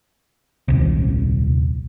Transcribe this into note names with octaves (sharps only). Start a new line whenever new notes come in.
D#1 C2